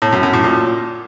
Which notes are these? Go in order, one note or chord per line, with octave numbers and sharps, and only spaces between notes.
A2
F#2
F#2
A2
A#2